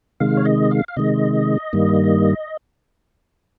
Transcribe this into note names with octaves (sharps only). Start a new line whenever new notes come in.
C3 D#3 G#3 F5
C#5
D#5
F5
F5
C3 D#3 G#3 D#5
G2 D#3 G3 A#3